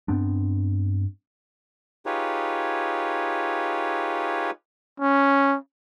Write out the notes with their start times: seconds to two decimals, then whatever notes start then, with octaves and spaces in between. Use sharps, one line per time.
0.08 G2 B3 C4 D4
2.06 D#4 F4 G4 G#4 B4 C#5
5.00 C#4